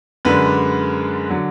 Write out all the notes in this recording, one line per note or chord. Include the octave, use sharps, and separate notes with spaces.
F#2 D3 G#3 D4 B4
D3 F#3